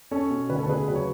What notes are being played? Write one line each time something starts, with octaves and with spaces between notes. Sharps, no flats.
C#4 A4 C#5
B2
D2 B4
A4
C#3 G#4 B4
F#3 B4
C#5